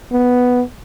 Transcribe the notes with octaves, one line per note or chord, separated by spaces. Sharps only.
B3